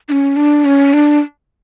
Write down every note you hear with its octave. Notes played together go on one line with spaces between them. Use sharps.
D4
C#4
D4
C#4
D4